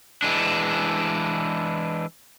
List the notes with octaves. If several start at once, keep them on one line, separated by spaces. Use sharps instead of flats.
E3 G#3 D4